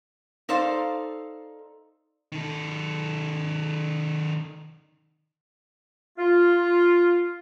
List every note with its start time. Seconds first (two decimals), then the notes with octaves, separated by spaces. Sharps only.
0.49 D#4 A4 C5 D5 F5
2.32 D#3 A4
6.18 F4